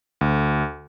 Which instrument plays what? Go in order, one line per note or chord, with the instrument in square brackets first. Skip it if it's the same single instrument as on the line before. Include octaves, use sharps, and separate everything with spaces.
[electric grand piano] D2